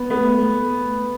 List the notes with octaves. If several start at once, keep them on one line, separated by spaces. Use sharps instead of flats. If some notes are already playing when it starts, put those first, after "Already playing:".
Already playing: B3
A3 B3
A3